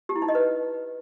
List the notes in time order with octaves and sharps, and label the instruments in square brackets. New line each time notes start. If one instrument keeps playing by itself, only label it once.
[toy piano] G4
E4
D#4
D#5
B4